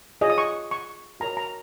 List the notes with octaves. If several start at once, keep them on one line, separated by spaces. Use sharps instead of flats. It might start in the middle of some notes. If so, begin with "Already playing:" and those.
F4 G#4 C#5 D#5
D#6
C#6
C#6
F#4 A#4 C#5 A#5
A#5